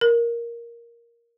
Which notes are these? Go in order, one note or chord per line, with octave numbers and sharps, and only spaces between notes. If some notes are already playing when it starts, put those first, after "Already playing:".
A#4